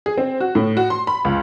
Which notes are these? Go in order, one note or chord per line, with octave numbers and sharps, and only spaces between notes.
G#4
C4
F#4
A2
F#4
C6
B5
C#2